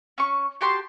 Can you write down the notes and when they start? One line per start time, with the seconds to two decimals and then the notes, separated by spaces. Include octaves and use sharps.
0.18 C#4 C#6
0.61 F#4 G4 A5 C6